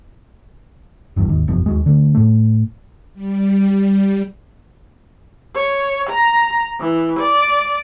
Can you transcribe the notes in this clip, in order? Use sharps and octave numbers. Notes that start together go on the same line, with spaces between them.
F#1 E2 G2
G#1 D#2
F#1 E2 B2 F3
D#2 F#3 G#3
D3 A3
A2 A3
G3
C#5
A#5
E3
D5